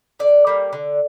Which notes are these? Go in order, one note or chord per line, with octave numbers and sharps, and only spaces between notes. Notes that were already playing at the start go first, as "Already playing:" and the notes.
D3 D5
G3 A#3
D3